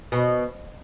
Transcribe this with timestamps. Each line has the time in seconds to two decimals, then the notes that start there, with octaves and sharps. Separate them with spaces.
0.12 B2